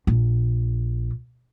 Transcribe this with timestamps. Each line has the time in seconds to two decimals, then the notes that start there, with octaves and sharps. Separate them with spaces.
0.07 A#1